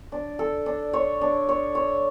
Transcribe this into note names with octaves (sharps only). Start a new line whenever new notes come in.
D4
A4
D4
C#5
D4
C#5
C#5